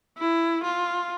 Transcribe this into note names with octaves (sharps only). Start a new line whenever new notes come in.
E4
F4